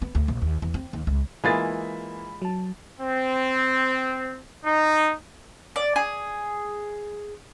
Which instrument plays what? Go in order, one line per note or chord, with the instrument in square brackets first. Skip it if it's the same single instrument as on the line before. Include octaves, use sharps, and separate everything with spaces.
[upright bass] B3
D2
A#1
D#2
E2
C4
D#2
C#2
[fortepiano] E3 A#3 [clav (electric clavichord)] G#3 F4 G#4 [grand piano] B5 A6
[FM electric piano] F#3 A5
[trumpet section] C4
D#4
[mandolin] D5
G#4